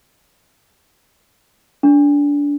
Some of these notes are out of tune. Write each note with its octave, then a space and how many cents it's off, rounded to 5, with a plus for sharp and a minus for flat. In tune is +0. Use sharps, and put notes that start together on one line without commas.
D4 -25